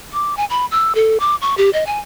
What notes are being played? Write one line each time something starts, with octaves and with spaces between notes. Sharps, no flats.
D6
G#5
B5
E6
A4
D6
C#6
G4
D#5
G#5